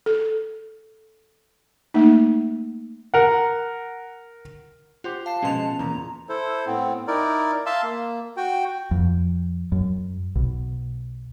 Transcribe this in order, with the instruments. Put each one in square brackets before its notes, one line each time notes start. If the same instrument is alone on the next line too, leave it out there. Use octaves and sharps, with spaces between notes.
[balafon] A4
A3 A#3 D#4
[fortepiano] A#4 F#5
[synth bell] F4 [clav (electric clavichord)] G4 C5 F#5
[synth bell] F5 C7 [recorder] A5
[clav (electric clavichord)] B2 F3 G#3 [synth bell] C#4 C6 F7
[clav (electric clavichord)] E2 A#2 [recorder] A#5
[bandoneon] E4 A4 C5
A2 B3 C4
D#4 E4 A#4 D5
E5 F5 A5 C6 E6
A#3
F#4 G5
[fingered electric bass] F2
F#2
B1